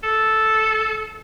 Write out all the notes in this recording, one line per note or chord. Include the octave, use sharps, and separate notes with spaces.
A4